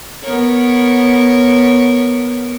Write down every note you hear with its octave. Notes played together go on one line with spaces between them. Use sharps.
B3 A#4 C#5